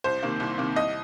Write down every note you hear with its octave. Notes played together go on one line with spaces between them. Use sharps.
C2 C5
C3 D#3 A#3
C2
C3 D#3 A#3
C2 D#5